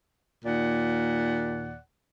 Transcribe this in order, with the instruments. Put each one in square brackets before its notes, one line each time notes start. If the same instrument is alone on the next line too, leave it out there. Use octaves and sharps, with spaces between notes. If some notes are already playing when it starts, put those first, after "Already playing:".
[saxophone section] D#2 A#2 D5 F#5